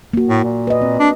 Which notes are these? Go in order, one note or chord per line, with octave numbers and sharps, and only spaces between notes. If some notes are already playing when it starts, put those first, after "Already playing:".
A#3 F#4
A2
A#2
B4 D#5
C4
D4